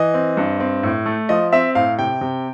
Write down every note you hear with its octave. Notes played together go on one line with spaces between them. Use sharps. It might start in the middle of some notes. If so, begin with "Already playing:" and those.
Already playing: E3 D#5
C4
G2
C4
A2
A3
F3 D#5
C4 E5
A2 F5
C3 G5
C3